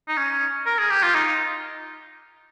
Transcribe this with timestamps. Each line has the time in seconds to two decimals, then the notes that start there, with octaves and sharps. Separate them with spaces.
0.08 D#4
0.17 C#4
0.66 A#4
0.79 G#4
0.90 G4
1.03 F4
1.14 D#4